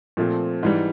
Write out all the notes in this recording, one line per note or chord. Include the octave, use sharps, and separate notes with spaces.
A#2 F3 A3 C4
G#2 E3 G3